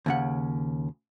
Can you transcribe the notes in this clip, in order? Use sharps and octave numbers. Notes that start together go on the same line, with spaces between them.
D#2 C#3 F#5